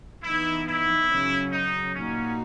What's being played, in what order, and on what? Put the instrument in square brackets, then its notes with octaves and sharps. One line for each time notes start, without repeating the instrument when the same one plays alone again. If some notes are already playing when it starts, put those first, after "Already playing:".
[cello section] E3 B3 D#4 [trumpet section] E4
[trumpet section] E4
[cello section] F#2 C#3 F#3 C#4
[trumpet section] D#4
[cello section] A#2 A#3 D#4 F#4 [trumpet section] C#4